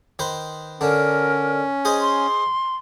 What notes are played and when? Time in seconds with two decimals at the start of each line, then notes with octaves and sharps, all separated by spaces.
0.19 D#3 B4 C5
0.81 D3 C#4 D4 A#4
1.85 G#4 C5 D#5
2.01 C6